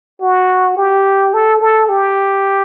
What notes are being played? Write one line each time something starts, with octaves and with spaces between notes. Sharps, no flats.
F#4
G4
A4
A4
G4